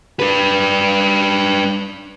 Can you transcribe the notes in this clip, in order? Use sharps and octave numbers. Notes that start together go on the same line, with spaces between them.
D4 B4